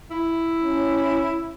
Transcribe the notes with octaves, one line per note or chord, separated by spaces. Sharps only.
E4
C#4